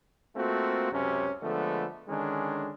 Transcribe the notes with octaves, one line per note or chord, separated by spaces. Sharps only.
A3 A#3 C4 F4 F#4
C#2 F#2 C3 C#4
D3 F3 G#3 A3 B3
D3 D#3 G#3 C#4 D4